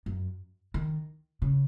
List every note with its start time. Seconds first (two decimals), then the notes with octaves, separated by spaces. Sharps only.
0.06 F#2
0.74 D#3
1.42 C#3